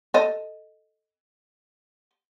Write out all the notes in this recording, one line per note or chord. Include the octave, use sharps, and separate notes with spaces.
A4 D#5